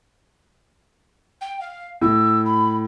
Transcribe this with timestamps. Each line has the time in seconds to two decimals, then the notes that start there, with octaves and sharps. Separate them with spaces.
1.41 G5
1.61 F5
2.01 A2 E6
2.45 B5